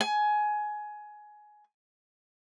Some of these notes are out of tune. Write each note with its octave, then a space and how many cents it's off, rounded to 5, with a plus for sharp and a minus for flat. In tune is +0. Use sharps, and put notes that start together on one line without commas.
G#5 +15